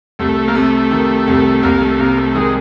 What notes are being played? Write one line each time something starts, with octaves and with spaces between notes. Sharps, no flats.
C2 A3
A#3
C3 A3
D#3
C2
C2 A#3
A3
C3 A#3
A3
D#3 G#3